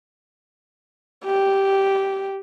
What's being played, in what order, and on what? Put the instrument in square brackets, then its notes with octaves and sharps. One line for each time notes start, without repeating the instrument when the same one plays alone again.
[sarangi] G4